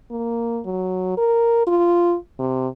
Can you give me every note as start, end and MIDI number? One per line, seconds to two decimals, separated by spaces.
0.11 0.60 58
0.65 1.14 54
1.17 1.64 70
1.67 2.16 65
2.39 2.68 48